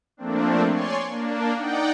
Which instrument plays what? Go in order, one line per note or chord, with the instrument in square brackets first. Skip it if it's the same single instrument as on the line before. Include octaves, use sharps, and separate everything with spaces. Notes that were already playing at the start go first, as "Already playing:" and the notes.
[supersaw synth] F3 A3 A#3 C4 D4
C#5 D5 G#5 C6 C#6
A#3 D4
D#4 D5 F#5 G5